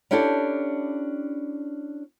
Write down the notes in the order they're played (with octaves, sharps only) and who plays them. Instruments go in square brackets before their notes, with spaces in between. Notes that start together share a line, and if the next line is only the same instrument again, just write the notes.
[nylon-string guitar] C#4 D4 E4 G4 A4 A5